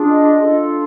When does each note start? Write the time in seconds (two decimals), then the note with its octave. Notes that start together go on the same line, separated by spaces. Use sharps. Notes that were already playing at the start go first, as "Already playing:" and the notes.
Already playing: D4 F4 G#4
0.09 D#5
0.42 D4 F4 A4